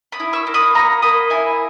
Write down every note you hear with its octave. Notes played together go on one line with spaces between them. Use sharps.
B5 D#6
E4
C#6 E6
A#3
B5 D#6
A#3 A#5 C#6
A#3 B5 D#6
E4 E5 G#5